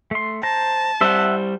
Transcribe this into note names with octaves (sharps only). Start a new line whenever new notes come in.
A3 C6
C5 A5 A#5
G3 C5 E5 F#5